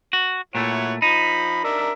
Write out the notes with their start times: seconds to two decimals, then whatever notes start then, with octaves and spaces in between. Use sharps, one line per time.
0.13 F#4
0.55 A#2 A3 E4 C#5 F#5
1.02 F3 D#4 B5
1.64 D4 A#4 E5